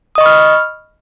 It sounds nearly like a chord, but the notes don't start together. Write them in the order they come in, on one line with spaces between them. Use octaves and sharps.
D#6 D#5 C#6 B5 F6